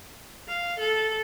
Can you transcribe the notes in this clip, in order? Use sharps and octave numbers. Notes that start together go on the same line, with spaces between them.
F5
A4